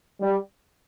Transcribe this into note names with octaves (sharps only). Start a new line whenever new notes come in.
G3